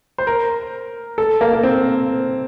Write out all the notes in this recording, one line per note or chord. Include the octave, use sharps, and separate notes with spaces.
C5
A#4
A4
A#3
A#3
C4